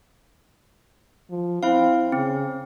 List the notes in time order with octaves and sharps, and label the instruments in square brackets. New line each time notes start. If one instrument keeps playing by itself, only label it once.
[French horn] F3
[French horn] C4 [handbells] E4 F5
[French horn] C#3 [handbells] C4